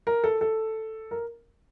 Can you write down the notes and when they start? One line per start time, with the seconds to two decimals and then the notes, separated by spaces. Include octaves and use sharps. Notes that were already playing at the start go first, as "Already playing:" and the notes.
0.07 A#4
0.24 A4
0.41 A4
1.11 A#4